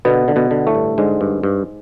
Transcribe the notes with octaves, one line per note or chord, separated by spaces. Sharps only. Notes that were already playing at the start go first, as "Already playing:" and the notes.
B2 D3 B3
D3
B2 B3
D3
A2 A3
G2
G#2 D3 G#3
G2
G2